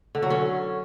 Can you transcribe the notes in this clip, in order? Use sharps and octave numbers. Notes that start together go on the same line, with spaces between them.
D3
F#3
C#4